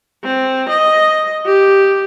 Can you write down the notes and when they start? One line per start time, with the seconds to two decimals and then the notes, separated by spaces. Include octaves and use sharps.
0.24 C4
0.69 D#5
1.46 G4